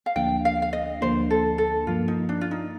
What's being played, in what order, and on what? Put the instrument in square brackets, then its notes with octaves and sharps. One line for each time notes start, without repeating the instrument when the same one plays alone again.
[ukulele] F5
[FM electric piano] D2 D3 F3 A#3 D4 [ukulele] G5
[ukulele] F5
F5
D#5
[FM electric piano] D2 D3 F3 A#3 D4 [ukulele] C5
[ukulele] A4
A4
[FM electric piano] G2 F3 A#3 [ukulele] F4
[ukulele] D#4
D4
F4
D#4